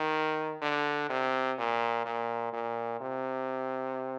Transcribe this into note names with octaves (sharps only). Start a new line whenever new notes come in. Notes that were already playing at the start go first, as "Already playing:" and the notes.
Already playing: D#3
D3
C3
A#2
A#2
A#2
C3